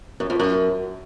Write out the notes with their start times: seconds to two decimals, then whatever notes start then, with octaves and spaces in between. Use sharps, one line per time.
0.20 F#2
0.30 F2
0.40 F#2